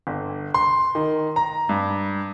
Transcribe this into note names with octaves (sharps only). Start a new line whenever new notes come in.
G1
C6
D#3
A#5
G2